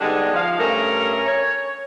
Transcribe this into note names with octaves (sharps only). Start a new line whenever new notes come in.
D3 G3 G#3 B3 D4 D#4
F3 F5
G2 A3 C#4 A#4
C#5